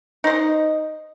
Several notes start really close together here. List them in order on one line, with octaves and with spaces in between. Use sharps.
D#4 C5 D#5